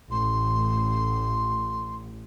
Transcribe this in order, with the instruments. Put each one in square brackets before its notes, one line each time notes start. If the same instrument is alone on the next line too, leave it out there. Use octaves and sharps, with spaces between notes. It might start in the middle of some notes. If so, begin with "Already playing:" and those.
[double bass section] A1 [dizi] C6